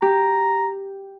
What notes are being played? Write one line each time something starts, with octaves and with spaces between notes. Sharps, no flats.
G4 A#5